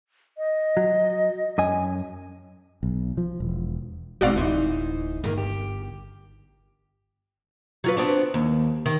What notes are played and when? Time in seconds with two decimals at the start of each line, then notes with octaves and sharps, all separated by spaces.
0.38 D#5
0.77 F#3
1.58 F#2 D#5 G#5
2.83 B1
3.17 F3
3.40 E1
4.21 G1 G#2 B2 C4 F#4 D5 F5
4.36 D1 E3 D#4 C5
5.24 G1 D#3 A3 A#3
5.37 G4
7.84 F#3 F4 B4
7.97 B3 C4 D4
8.34 D#2
8.86 D#3